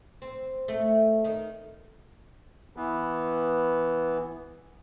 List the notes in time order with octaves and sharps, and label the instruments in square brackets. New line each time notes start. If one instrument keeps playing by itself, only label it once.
[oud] C4
A3
D#3
[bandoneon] E3 B3